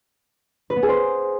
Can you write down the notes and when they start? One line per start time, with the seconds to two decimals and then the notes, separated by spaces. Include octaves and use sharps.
0.70 B4
0.76 B3
0.83 G#4
0.89 C5